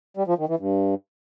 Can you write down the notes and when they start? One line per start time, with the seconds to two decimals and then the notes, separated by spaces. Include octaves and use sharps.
0.17 G3
0.28 F3
0.38 D#3
0.49 E3
0.59 G2